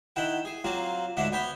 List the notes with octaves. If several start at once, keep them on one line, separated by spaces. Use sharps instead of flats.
D#3 E4 F#5 G5
G#4
F#3 A#3 C4 F4 F#4
D2 G#2 D3 D4 E5 F#5
B3 C#5 G5 B5